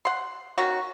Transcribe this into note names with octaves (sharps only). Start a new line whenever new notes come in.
F#5 C6
D#3 C#4 F#4